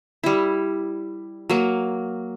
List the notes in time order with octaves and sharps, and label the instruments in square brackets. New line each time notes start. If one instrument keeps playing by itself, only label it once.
[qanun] G3 E4
F#3 A#3